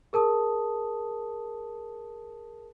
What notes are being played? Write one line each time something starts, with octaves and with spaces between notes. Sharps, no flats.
G#4 A#4 A5 D#6